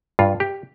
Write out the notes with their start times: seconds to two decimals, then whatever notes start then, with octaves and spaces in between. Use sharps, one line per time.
0.19 G2 F4
0.40 G4